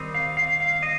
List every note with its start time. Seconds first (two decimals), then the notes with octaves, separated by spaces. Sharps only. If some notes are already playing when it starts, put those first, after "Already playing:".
Already playing: D#3 G3 C4 D#4
0.14 F5
0.37 F5
0.60 F5
0.83 D#5